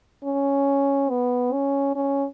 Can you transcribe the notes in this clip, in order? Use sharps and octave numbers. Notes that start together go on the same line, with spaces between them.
C#4
B3
C#4
C#4